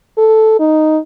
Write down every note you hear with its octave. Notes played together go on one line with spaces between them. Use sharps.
A4
D#4